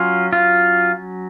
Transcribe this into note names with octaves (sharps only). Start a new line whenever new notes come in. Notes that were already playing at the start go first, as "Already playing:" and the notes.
Already playing: F#3 C#4 F4
F4